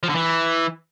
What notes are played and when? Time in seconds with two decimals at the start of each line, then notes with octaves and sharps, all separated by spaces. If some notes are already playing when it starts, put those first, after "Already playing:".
0.03 F3
0.09 D3
0.15 E3